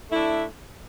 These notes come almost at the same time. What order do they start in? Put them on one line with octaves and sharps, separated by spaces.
A3 E4 D4